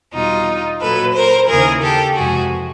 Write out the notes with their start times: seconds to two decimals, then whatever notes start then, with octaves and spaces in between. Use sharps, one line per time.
0.12 E2 B2 G3 D#4 F4
0.80 A#2 F#3 A4 B4
1.14 A#4 C5
1.48 D#2 C#3 E3 G#4 A#4
1.82 G4 A4
2.16 F2 C3 E3 G#3 F#4 G#4